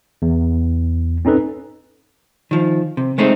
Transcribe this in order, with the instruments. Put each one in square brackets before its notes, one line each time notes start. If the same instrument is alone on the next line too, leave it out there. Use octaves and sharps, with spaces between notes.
[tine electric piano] E2
C4 C#4 D#4 A4 B4
[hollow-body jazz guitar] D#3 F3
C3
G#3 A3 C4 D#4